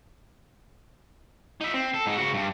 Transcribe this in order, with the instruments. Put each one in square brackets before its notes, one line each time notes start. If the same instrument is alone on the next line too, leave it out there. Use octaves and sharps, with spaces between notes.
[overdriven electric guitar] D#4 E5
C4
A4
G#2 D#4
C#3 F#4
G2